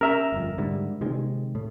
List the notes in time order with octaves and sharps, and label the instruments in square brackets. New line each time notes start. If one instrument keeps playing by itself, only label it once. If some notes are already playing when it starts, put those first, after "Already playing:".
[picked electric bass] C#4 [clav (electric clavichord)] A#4 E5 A#5
[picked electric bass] G1 F2
G#2 D3 G3
C3 D#3 G#3
A2